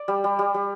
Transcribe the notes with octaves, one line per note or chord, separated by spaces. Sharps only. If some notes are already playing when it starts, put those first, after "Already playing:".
Already playing: D5
G3
G3
G3
G3